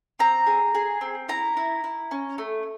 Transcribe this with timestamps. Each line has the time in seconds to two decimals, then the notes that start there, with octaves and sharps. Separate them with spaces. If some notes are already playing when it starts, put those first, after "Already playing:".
0.19 C4 A#5
0.47 G#4
0.75 G#4
1.01 C4
1.29 E4 A#5
1.57 E4
1.84 E4
2.11 C#4
2.38 A3